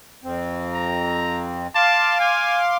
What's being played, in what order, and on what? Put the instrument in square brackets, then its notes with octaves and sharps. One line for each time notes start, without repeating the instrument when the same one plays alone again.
[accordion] F2 C4
[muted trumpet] A#5
[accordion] F5 C6 D6 [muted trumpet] A5
[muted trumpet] G#5